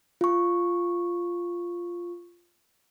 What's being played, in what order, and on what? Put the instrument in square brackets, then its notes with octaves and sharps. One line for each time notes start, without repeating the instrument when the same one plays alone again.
[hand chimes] F4 C#6